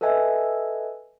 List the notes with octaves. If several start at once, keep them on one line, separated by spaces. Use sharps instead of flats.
A4 B4 D#5 E5 G#5